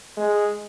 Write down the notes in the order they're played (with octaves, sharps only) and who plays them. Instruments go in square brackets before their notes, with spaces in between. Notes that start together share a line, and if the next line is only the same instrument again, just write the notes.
[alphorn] G#3